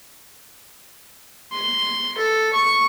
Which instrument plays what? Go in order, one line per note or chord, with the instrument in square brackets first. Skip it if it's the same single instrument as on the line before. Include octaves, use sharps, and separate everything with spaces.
[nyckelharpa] C6
A4
C#6